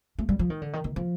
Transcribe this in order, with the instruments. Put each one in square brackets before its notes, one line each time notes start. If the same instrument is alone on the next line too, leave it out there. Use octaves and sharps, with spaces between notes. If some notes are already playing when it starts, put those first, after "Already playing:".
[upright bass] A3
G3
F3
D#3
D3
D#3
D#3
F3